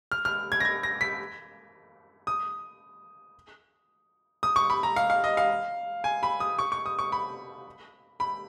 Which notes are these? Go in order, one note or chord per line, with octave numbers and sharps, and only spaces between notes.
F6
F6
G#6
A#6
G#6
A#6
B6
D#6
D#6
C#6
B5
A#5
F5
F5
D#5
F5
G#5
B5
D#6
C#6
C#6
D#6
C#6
B5
B5